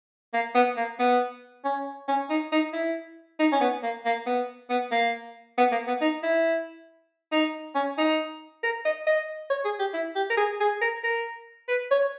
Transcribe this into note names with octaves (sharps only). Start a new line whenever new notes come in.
A#3
B3
A#3
B3
C#4
C#4
D#4
D#4
E4
D#4
C#4
B3
A#3
A#3
B3
B3
A#3
B3
A#3
B3
D#4
E4
D#4
C#4
D#4
A#4
D#5
D#5
C#5
G#4
G4
E4
G4
A#4
G#4
G#4
A#4
A#4
B4
C#5